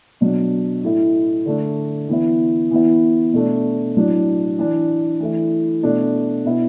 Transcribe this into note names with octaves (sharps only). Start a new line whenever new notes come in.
B2 F#3 D4
A2 A3 E4
D3 A3 D4
E3 B3 E4
E3 B3 E4
B2 A3 D4
A2 F#3 D4
E3 D4
E3 A3 E4
B2 A3 D4
B2 B3 E4